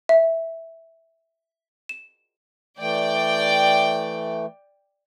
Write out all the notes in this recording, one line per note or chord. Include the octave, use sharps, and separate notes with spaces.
E5
E7
E3 A3 D5 G5